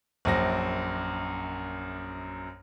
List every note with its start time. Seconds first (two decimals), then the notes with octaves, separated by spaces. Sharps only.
0.25 A#1 F#2 A#6